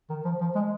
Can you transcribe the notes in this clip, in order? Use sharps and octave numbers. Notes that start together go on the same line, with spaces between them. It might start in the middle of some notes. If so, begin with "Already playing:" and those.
D#3
F3
F3
G#3